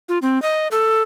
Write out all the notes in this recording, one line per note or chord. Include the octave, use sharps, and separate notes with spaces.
F4
C4
D#5
A4